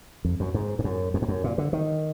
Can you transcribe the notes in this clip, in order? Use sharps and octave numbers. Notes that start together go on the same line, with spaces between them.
F2
F#2
G#2
G#2
F#2
F2
G#2
F#2
A#2
D3
D#3